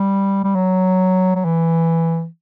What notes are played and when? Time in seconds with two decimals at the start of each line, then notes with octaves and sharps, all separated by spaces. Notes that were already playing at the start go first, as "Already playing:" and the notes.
Already playing: G3
0.44 G3
0.55 F#3
1.35 F#3
1.45 E3